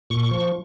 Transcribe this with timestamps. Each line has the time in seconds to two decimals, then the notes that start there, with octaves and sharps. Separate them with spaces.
0.10 A#2 C#6
0.31 F3